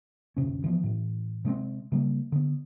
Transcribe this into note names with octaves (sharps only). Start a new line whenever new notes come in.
F#1 D2 C3 C#4
E3 F3 B3
A2 E3
C3 G#3 B3 C4
C#3 G3 A#3
D3 B3